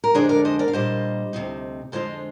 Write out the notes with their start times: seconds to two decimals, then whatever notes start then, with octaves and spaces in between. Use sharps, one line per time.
0.04 A#4
0.14 F2 D3 G#3 D4 G#4 C5
0.29 A#4 D5
0.45 C5 D#5
0.59 A#4 D5
0.68 F5
0.73 A#2 G3 A#3 C5 D#5
1.33 D2 C3 G3 C4 D#4
1.92 F2 D3 G#3 D4 F4 C5 D#5